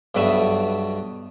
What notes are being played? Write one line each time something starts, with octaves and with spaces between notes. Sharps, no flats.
B1 G2 B2 B4 E5